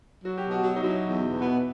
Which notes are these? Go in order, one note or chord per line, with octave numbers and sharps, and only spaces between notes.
F#3 F#4
G4
B2
F#4
F#3
D#4
F#3 E4
E2
B2
B3 E4